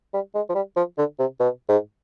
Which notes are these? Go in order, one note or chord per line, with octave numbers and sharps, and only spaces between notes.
G3
G#3
F3
G3
F3
D3
C3
B2
G#2